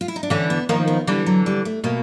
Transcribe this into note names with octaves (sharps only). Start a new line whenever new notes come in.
F4
E4
D#4
D4
D3 E3 C#4
B3
D#3 F3 A#3
B3
D3 E3 G3
F#3
G3
A3
B2 A#3